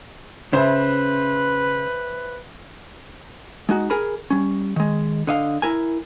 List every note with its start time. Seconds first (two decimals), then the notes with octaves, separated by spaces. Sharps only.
0.53 C#3 B4 C5 E5
3.69 G#3 D#4 F#4
3.90 G#4 A#4 G#5 B5
4.30 G3 C#4
4.76 D#3 G#3
5.27 D3 D#5 F5
5.62 E4 A#4 G#5